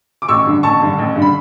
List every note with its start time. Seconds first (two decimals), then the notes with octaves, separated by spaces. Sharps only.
0.22 D6
0.28 A1 C#6 E6
0.45 G2 D3
0.63 A1 A5 C#6
0.80 G2 D3
0.98 A1
1.16 G2 D3
1.22 B5